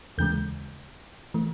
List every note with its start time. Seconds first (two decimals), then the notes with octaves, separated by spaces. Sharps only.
0.18 D#2 C#3 E3 G#3 G6
1.34 E3 A3